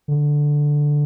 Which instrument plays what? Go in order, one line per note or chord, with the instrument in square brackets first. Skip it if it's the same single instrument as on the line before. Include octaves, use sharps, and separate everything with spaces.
[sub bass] D3